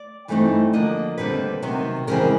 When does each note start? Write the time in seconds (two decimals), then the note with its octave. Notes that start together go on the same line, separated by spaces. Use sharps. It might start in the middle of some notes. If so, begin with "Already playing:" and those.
Already playing: D5
0.28 G2 E3 A3 C4 D#4
0.73 D3 F3 A#3 D4 D#5
1.18 D#2 D3 G3 C4 B4
1.62 C3 D#3 F#3 B3
2.07 F2 C#3 E3 G#3 C4 A#4